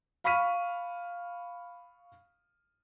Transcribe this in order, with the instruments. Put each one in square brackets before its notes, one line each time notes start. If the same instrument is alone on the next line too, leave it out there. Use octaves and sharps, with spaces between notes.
[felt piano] F5 B5 C#6 F6 B6 D#7